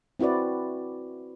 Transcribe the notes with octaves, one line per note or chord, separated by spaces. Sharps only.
C4 E4 F#4 B4 D5